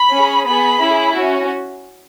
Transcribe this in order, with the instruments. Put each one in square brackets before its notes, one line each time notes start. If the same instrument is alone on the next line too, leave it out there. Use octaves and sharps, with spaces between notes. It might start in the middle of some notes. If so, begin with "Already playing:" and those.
Already playing: [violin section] B5
C#4
G#4
B3 G#4 B5
C#4 E4 G#4
C#4 F#4